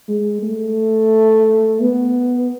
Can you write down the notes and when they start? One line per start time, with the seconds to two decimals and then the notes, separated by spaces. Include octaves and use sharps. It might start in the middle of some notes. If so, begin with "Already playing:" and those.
0.08 G#3
0.42 A3
1.80 B3